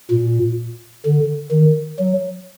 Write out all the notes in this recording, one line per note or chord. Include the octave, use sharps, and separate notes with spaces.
A#2
D3
D#3
F#3